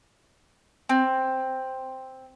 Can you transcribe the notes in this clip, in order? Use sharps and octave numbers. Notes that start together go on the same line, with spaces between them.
C4